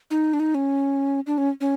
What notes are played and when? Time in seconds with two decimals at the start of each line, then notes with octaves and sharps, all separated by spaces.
0.11 D#4
0.34 D4
0.40 D#4
0.55 C#4
1.27 D4
1.38 C#4
1.61 C#4